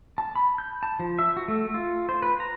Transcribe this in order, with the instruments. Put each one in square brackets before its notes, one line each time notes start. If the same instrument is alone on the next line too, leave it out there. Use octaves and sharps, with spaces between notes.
[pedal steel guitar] A5
B5
G6
A5
F3
E5
F#4
A3
F4
C5
B4
A#5